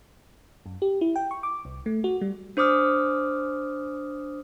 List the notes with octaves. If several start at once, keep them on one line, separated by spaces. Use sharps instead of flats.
F#2
G4
E4
G5
C#6
D6
C2
A3
F#4
G3
D4 C5 D6 D#6 F6